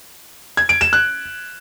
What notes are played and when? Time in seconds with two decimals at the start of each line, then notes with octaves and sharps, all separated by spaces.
0.57 G#6
0.69 D7
0.81 E7
0.93 F#6